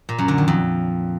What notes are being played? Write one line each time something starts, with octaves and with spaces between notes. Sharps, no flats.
A#2
F#2
D3
D#3
F2